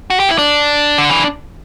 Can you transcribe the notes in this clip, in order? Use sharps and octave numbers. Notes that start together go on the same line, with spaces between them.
F#4
G4
E4
D4
D3
E3